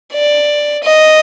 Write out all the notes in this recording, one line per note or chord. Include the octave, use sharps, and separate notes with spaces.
D5
D#5